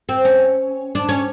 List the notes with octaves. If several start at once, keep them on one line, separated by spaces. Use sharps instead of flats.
C4
C#4
D4
C#4